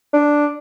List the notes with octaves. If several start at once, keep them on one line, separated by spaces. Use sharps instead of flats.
D4